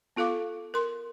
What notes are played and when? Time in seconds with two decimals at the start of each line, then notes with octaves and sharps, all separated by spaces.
0.16 B3 F4 A4 F5 D6
0.74 A#4 C6